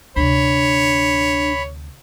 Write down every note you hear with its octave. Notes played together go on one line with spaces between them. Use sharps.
D2 C3 D4 C#5 B5